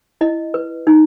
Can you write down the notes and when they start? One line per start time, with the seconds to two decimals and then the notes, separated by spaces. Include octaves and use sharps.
0.21 E4 D#5
0.54 B4
0.87 D#4